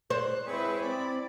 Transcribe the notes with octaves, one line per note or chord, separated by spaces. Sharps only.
C5 D5 F#6
G#3 C4 E4 G#4 B4 C#5
C4 D5 B5